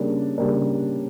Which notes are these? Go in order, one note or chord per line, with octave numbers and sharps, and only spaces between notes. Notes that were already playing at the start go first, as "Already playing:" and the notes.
Already playing: C#3 G3 A#3 D4
C#3 G3 A#3 D4